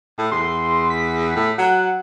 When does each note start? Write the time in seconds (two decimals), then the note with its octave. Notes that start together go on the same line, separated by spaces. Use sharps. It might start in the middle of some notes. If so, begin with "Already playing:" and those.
0.18 A2
0.31 E2 C6
0.90 B6
1.36 A2
1.58 F#3 F#5